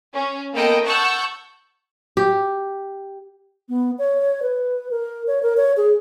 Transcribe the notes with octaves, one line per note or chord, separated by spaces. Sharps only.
C#4
A#3 B3 A4 D#5 G5
F#5 A5 C#6 E6 F#6 G6
G4
B3
C#5
B4
A#4
C#5
A#4
C#5
G#4